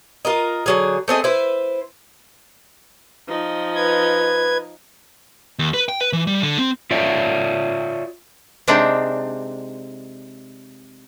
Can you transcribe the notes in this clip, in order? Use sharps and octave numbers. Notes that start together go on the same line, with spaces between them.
F4 A#4 D#5
D3 F#3 G#4
A3 C4 G#4 D#5
E4 B4 C5
F3 D#4
B4 G#6
D#2
B4
G5
B4
E3
G3
D3
C4
F4 C#5 D5 E5
C3 G#3 C4 D4 D#4